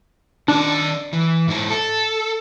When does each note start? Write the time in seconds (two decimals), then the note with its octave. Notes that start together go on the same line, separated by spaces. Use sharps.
0.48 D#3 D4 D5
1.13 E3
1.48 G#2 E4
1.70 A4